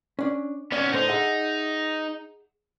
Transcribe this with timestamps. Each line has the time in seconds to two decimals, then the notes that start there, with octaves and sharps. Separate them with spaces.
0.19 C#4 D4
0.72 B3 C#4 D5
0.93 A2 D3 D#4 C5
1.08 G#4 E5 F#5